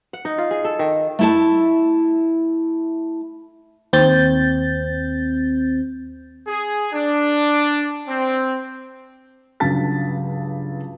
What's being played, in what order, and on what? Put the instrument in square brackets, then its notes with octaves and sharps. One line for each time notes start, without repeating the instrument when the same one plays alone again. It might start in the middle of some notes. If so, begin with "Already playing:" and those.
[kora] F#5
D#4
F4
G#4
A4
D#3
[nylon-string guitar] A3 E4 A5
[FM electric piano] D#2 C4 G6 A6
[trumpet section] G#4
D4
C4
[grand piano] C#2 G2 F#3 A5 A6 B6